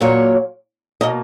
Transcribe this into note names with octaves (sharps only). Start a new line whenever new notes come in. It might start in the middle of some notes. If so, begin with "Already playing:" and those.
A#2 F#3 A#3 C#5
B2 A#3 D#5